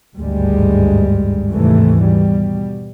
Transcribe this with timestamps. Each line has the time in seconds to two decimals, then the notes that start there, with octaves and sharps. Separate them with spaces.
0.16 G#1 D2 G2 G3 G#3
1.52 D#2 G#2 C3 E3 A3
2.00 B2 G3